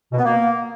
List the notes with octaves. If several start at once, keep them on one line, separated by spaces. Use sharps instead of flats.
B2
B3
A#3